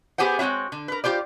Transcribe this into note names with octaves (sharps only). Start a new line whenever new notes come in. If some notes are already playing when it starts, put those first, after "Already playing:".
B3 G4 G#4 C5 F#5
G#3 C4 E4 F#4 C#5
D3
A#4 B4
F4 G4 C5 D5